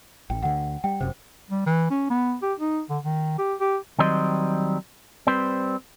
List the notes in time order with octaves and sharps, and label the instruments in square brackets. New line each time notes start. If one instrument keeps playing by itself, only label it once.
[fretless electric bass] A1 [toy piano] G5
[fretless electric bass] D2 D3 [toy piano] F#5
[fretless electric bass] G3 [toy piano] G5
[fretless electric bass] F1 F#2 C3 [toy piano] C5
[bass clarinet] G3
E3
C#4
B3
G4
D#4
D3
D#3
G4
G4
[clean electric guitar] D#3 F#3 G3 C4 D#5 C6
G3 C4 B4 C5